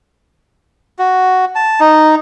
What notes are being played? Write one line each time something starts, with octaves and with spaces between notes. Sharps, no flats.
F#4
A5
D#4